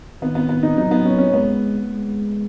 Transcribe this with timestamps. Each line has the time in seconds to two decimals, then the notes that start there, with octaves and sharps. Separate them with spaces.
0.22 D#3 B3
0.35 B3
0.49 B3
0.63 D#4
0.77 F#3 D#4
0.91 B3
1.05 C#4
1.18 C#4
1.32 G#3 B3
1.88 G#3